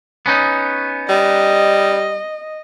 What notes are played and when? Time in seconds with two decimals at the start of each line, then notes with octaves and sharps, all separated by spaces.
0.26 B3 C#4 D#4
1.09 G3 D#5